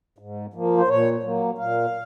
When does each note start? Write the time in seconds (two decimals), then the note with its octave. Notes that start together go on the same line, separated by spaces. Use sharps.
0.18 G#2
0.54 F3 A#3
0.77 C5
0.88 A#2 C#5
1.23 F#3 A#3
1.58 A#2 F5